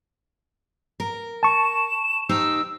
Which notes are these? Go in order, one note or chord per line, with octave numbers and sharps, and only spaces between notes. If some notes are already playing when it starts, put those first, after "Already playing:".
A#4
A5 C#6 E7
D#4 G4 C5 E6